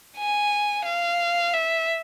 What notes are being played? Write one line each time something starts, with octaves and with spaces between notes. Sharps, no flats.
G#5
F5
E5